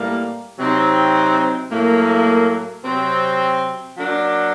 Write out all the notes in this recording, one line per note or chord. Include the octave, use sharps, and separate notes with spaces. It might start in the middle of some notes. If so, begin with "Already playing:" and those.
Already playing: A2 G3 A#3
C3 F#3 C4 D#4
A2 F#3 A#3
C3 F#3 C4
F#3 A#3 D4